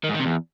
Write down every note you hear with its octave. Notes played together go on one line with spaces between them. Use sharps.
D#3
G#2
D#3
C3
E2